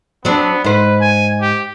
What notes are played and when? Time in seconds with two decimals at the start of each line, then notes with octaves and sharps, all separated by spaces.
0.25 F#3 B3 C4 D4
0.65 G#2 B4 C5
1.01 G#5
1.41 G4